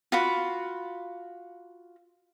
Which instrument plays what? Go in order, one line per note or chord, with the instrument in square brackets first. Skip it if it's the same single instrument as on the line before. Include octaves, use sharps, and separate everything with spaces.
[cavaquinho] F4 F#4 B5